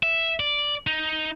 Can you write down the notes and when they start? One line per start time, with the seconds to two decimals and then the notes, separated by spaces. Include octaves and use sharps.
0.03 E5
0.40 D5
0.87 D#4